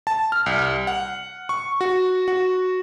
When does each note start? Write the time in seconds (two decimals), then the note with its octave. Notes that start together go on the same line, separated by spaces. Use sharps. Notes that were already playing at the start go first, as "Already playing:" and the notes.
0.07 A5
0.32 F6
0.46 C2
0.87 F#5
1.49 C#6
1.81 F#4
2.28 F#4